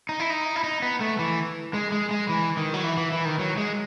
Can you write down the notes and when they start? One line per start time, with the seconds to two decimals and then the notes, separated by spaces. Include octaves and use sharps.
0.09 D#4
0.20 E4
0.30 D#4
0.56 E4
0.64 D#4
0.82 B3
1.01 A3
1.19 E3
1.74 G#3
1.92 G#3
2.11 G#3
2.29 E3
2.57 D#3
2.74 F#3
2.84 E3
2.97 E3
3.12 E3
3.25 D#3
3.39 F#3
3.57 G#3